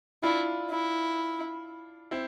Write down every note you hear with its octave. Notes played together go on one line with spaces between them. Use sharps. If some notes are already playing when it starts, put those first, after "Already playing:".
D4 E4 F4
E4
C4 E4